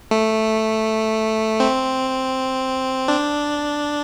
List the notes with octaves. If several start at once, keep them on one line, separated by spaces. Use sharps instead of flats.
A3
C4
D4